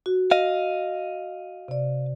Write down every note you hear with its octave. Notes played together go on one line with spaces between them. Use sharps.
F#4
D#5 F5
C3 D5